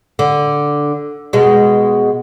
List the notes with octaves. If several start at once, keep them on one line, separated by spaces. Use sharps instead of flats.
D3
B2 G#3